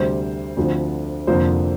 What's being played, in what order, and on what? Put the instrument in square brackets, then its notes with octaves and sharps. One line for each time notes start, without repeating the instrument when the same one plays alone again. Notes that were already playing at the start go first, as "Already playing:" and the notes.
Already playing: [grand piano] D2 C3 G3 C4 C5
D2 D3 F3 C4
F1 F2 D3 F3 A#3 C5